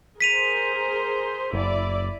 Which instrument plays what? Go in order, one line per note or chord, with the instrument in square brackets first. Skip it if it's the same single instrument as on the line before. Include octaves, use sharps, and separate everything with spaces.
[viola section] G#4 A#4 C5 [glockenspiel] B6 D#7 F7
[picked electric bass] F#1 [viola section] E4 D5